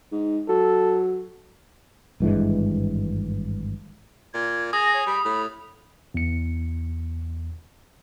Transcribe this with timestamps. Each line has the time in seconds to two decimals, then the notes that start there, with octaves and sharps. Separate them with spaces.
0.12 G#2
0.48 F#3 A4
2.20 G#1 G2 E3 G#3
4.34 A#2 G#6
4.73 G#4 D#6 A#6
4.94 C#5
5.06 G3 B5
5.25 A2 B5
6.14 E2 C#7